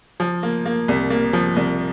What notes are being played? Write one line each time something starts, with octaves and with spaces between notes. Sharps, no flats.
F3
A#3
A#3
C2
A#3
F3
C2